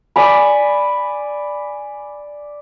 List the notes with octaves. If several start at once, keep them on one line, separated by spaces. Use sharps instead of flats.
D5 G#5 B5